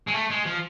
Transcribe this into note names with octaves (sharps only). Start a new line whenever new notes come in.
G#3
A3
G#3
F3